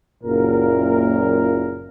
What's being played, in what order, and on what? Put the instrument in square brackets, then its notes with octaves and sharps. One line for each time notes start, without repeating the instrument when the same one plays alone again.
[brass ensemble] F#1 A#2 A#4